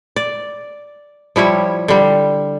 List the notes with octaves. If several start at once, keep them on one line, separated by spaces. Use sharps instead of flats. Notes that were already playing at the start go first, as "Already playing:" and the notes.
D5
F3 G3 E4 C#5
D3 G3